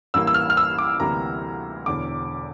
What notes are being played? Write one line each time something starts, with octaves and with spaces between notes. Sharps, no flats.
A1 G2 E3 A#3 E6
E6
F6
F6
E6
D6
D2 C3 E3 G3 A#3 A#5
E1 E2 D3 D6